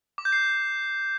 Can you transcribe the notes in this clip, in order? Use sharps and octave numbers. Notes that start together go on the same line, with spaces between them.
D6
G6
C7